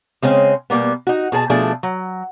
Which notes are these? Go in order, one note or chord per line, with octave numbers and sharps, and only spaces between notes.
C#3 G#3 C4 C#4
B2 G3 A#3 B3
D#4 F#4
B2 G#4 A4 A5
B2 F3 A3 D4 G#4
F#3